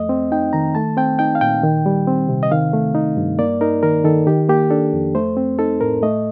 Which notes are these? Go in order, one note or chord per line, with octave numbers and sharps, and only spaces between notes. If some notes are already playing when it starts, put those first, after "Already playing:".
Already playing: F2 A3 D#5
C4
D#4 G5
D#3 A#5
A3 A5
C4 G5
D#4 G5
F5
A#2 G5
D#3
G3
C4
C3
D#5
D#3 F5
A3
D#4
G2
A#3 D5
D#4 A#4
D#3 A#4
D#3 A4
D#3 G4
A#3 G4
D4 A4
F2
A3 C5
C4
D#4 A4
A2 A#4
A3 D#5